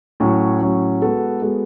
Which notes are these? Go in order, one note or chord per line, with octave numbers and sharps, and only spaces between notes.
A2 F#3 C#4
A2 F#3 C#4
G#3 B3 F#4 A4
G#3 B3 F#4 A4